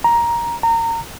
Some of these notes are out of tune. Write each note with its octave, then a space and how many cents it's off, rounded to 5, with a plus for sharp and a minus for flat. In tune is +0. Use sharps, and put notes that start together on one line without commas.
A#5 +10
A#5 -25